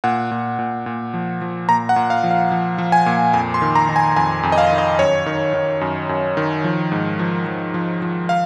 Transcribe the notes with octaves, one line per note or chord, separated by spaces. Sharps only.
A#2 F#5
A#2
A#2
A#2
F3
F3
A#2 A#5
F#5
A#2
F5
F3
F5
F3
F3
G#5
A#2
F2 G#5
C6
D#3
A#5
D#3
G#5
F2 G#5
F2
D#5
F5
D#3
D#5
F#2 C#5
D#3
D#3
F#2
F#2
D#3
F3
G#2
F3
F3
F3
F3
F5